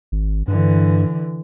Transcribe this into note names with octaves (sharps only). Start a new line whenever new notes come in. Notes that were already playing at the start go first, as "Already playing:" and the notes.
G#1
G2 D3 E3